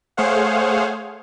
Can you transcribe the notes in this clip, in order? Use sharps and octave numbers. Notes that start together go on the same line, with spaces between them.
A3 G#4 C5 C#5 F5 F#5